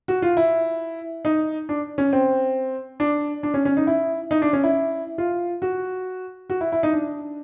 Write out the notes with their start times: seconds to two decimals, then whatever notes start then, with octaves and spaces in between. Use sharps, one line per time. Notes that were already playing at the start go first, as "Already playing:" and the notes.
0.08 F#4
0.22 F4
0.37 E4
1.25 D#4
1.69 D4
1.98 C#4
2.13 C4
3.00 D4
3.43 D4
3.54 C#4
3.65 C#4
3.77 D#4
3.87 E4
4.31 D#4
4.42 D4
4.53 C#4
4.64 E4
5.18 F4
5.62 F#4
6.50 F#4
6.61 E4
6.72 E4
6.83 D#4
6.93 D4